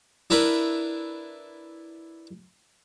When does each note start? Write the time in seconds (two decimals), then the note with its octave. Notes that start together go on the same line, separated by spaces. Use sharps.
0.30 D4 E4 A#4 B4